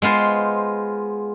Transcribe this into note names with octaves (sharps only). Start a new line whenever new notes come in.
G#3 B3 F4 C5